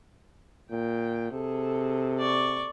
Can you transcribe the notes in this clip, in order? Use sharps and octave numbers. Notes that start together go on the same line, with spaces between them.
A#2 G5
C3 G#4 A4
D5 C#6